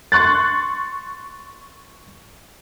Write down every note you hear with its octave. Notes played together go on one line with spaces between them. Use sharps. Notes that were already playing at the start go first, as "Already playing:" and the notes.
C6 C#6 F#6 A6